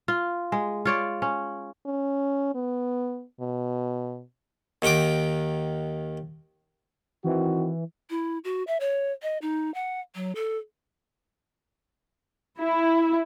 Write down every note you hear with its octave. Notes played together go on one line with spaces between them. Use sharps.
F4
G#3
F4 C#5 D5
C#4
C#4
B3
B2
D#2 D#3 F#5 G5 D6
D#3 E3 C4 F#4
E4
F#4
E5
C#5
D#5
D#4
F#5
F#3
A4
E4